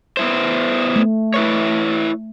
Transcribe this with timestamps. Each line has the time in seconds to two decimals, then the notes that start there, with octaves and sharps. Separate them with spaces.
0.17 B3 E4 C5
0.96 A3
1.34 E4 B4 C#5